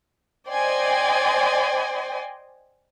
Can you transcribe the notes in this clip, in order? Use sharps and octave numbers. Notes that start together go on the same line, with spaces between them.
C5 D5 D#5 G5 G#5 C6